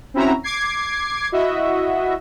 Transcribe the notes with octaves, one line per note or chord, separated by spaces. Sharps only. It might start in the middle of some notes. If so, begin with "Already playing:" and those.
C4 C#4 E4 F#4 E5 A#5
D6 G#6 C7
E4 F#4 D#5 E5